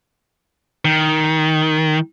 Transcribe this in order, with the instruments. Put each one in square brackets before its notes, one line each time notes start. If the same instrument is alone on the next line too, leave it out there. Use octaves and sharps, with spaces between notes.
[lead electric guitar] D#3